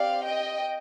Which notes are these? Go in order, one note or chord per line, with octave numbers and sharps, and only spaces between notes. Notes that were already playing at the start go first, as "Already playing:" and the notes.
Already playing: C4 G4 D5 F5
D#5 G5